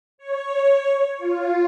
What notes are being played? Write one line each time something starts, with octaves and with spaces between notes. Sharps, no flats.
C#5
F4